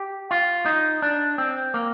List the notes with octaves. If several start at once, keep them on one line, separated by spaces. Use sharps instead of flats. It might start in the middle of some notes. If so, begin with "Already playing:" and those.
Already playing: G4
F4
D#4
D4
C4
A#3